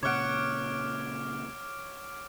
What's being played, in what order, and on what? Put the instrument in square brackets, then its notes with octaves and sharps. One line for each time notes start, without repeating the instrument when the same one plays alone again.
[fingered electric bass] A#2 C#3 [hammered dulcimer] C#5 F#5 [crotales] D6 F6 D7